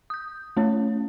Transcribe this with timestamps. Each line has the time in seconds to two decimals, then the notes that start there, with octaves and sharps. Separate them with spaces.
0.10 D#6 G6
0.57 A3 C#4 C#5